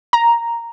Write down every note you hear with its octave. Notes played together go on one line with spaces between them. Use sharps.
A#5